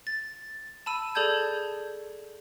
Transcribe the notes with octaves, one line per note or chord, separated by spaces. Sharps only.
A6
A5 B5 E6 D#7
G#4 A4 D5 A5 G6 G#6